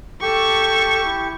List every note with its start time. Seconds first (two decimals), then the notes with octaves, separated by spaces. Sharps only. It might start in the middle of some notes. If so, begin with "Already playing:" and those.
0.22 G4 A4 C#6
1.04 E4